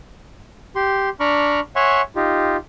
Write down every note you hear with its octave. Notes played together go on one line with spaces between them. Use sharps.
G4 C6
D4 A#5 B5 C#6 D6 F6
C#5 E5 F#5 G#5 C6 C#6
D#4 F4 G4